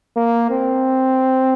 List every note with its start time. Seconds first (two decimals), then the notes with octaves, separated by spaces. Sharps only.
0.16 A#3
0.50 C4